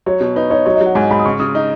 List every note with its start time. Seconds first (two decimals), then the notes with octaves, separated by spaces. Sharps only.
0.06 F#3 C#5
0.21 B2
0.36 D#4 B4
0.50 D#4 C#5
0.65 F#3 C#5
0.76 F#3 D#5
0.86 F#5
0.95 G#2 G#5
1.11 G#2 B5
1.19 D#6
1.25 C#3 C#6
1.40 C#3 D#6
1.55 D#4